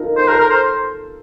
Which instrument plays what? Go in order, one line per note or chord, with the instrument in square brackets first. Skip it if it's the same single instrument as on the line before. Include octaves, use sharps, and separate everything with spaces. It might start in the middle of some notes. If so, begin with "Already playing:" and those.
Already playing: [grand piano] D#4 F4 A4 A#4
[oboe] C5
[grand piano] A4 [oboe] A#4
[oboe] A#4
C5